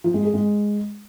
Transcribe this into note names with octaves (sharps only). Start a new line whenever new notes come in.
F3
G#3
G#4
G#3